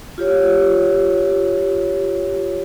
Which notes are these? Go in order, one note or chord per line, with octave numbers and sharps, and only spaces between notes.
F4 G4 C#5